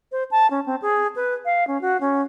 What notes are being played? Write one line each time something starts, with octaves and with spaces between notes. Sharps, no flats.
C5
A5
C#4
C4
G#4
B4
F5
C#4
F#4
C#4